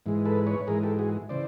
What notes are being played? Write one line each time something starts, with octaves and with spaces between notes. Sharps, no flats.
G#2 E3 G#3
A4 B4
B4 C#5
G#2 E3 G#3 G#4 A#4
G4 A4
F#4 G#4
C#3 E3 C5 D5